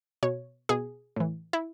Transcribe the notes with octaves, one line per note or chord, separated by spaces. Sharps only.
B2 C#5
B2 G#4
A2 E3
E4